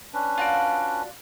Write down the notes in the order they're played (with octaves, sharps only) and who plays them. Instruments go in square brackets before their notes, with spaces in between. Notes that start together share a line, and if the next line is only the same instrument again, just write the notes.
[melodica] C#4 D4 B4
[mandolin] F4 F#4 D5